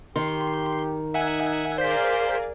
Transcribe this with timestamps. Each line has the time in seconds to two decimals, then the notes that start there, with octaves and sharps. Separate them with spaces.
0.16 D#3 G4 C6
1.14 D#4 E5 F#5 G#5
1.78 G#4 A#4 C5 D5 F5 G6 B6